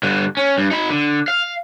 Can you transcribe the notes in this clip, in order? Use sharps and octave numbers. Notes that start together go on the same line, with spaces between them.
G2 D3
C#4
G2
D#4 B5
D3
F5